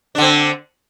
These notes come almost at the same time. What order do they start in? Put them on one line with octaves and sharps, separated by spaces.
D4 D3 C4